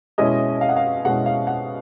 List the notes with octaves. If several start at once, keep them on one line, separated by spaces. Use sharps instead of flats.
B2 G#3 C#4 E4 D#5
F5
F#5
F5
B2 G#3 C#4 E4 F#5
F5
F#5